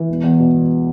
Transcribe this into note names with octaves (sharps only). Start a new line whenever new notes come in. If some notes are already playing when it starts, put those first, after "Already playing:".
Already playing: E3
E1
E2
B2
E1